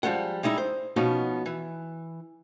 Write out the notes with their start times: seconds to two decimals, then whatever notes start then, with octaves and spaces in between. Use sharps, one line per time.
0.03 F3 G3 G#3 F#5
0.43 G3 G#3 D#4 E4
0.58 C5
0.96 B2 F3 B3 C#4 D#4
1.46 E3